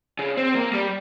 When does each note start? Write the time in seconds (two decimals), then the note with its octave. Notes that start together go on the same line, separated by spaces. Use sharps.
0.19 C#3
0.37 C4
0.55 A#3
0.73 G3